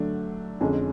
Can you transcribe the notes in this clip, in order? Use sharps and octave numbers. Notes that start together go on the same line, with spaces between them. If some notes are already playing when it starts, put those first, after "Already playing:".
Already playing: D3 F#3 A3 D4
F2 D3 G#3 C#4